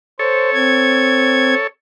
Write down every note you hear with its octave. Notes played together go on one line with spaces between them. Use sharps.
A4 C5 C#5
C4 G#6